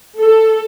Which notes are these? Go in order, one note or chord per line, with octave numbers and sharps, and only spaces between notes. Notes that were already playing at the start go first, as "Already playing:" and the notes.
A4